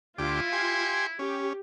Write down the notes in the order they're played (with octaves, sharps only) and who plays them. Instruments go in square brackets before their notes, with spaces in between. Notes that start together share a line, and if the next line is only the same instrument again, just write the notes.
[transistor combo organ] D2 G4 D6 [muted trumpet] E4 [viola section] F4
[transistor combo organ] G4 G#5 C6
[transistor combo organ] C#4 [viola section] G4